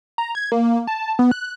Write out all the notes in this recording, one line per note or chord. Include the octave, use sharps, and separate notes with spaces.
A#5
G#6
A#3
A5
B3
F#6